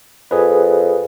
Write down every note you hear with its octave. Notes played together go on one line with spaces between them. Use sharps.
F2 G#4 B4